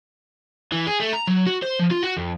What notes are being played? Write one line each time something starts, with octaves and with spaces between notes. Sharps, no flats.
E3
G#4
A3
A#5
F#3
F#4
C5
F3
F4
F#4
F2